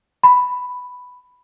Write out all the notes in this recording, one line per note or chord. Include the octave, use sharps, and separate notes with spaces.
B5